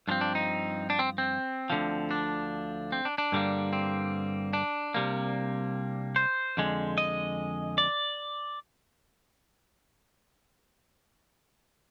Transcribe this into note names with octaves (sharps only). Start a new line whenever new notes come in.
G2 F3 C4 D4
D4
D#4
D4
C4
C4
D2 D3 F3
D4
C4
D4
D4
G2 D3 G3 A#3
C4
D4
C2 C3 G3 A#3
C5
F2 D3 G#3
D#5
D5